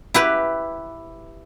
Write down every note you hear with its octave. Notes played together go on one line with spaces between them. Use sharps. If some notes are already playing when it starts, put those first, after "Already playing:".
E4 G4 B4